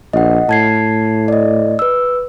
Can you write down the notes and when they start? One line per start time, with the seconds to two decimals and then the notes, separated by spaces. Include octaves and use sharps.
0.13 A#1 D#5 F#5
0.49 A2 A5 G#6 C7
1.28 D5 D#5
1.79 B4 E6